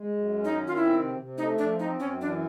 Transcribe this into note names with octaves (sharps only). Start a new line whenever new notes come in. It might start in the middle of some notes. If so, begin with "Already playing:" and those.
Already playing: G#3
F#2
C#4
D#4
D#3
F4
C4 E4
C3
C3
A3 D#4
F3 D4
C4 D#4
F#2 C#4
E3 D4